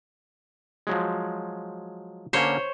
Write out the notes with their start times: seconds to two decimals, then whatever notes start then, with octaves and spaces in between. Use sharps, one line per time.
0.87 F3 F#3 G#3
2.33 D3 A#3 C#4 C5 C#5